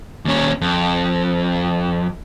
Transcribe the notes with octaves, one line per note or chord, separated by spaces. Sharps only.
D#2 C#4
F2